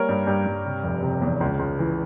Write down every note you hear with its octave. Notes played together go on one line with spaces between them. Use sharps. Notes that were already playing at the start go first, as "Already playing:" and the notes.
Already playing: G3 A#3 A#4 C#5
G2
G2
G2
C3
F1
C3
E2
C#2
C#2
E3